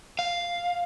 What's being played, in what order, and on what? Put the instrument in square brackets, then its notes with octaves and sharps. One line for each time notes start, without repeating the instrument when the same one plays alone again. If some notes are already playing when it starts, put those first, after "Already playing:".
[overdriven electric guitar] F5